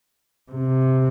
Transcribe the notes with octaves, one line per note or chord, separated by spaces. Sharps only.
C3